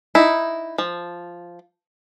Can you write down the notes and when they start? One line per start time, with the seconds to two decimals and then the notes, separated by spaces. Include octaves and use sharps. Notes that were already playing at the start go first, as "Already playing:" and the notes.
0.15 D#4 E4
0.78 F3